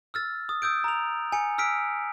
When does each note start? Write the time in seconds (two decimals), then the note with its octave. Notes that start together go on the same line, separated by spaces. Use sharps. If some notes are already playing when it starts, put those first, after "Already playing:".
0.14 E6 F6 A6
0.49 D#6
0.62 D#6 E6 G6 D7
0.84 A#5 F7
1.32 G#5 C#7
1.58 E6 F6 B6 D7